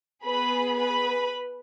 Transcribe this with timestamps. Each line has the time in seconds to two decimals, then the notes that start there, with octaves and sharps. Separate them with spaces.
0.24 B3 G#4 B4 B5
0.78 B4 B5